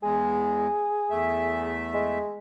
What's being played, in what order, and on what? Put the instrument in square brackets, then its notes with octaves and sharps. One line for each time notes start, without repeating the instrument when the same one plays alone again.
[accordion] E2 G#3 [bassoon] G#4
[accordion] E2 A3 E5
[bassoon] G#3